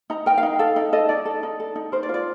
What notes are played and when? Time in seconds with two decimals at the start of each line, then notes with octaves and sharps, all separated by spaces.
0.10 D#4 A#5
0.26 A#4 G5
0.38 F5
0.43 D#4
0.59 A4 F5
0.76 D#4
0.93 A4 D#5
1.09 D#4 D5
1.25 A4
1.43 D#4
1.60 A4
1.76 D#4
1.92 A#4 C5
2.03 D5
2.09 F4
2.14 D5